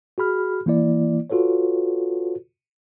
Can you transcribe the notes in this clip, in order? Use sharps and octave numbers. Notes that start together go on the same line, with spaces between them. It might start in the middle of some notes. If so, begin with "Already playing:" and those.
F#4 G#4 B5 F6
E3 A#3 E4 D5
F4 F#4 A4 B4 C#5